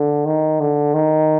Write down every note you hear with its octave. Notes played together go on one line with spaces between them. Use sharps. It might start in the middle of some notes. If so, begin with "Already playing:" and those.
Already playing: D3
D#3
D3
D#3